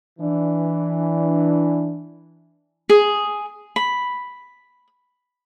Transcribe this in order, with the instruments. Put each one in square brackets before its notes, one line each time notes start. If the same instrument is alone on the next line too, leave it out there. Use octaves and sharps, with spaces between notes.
[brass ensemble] E3 D4
[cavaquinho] G#4
B5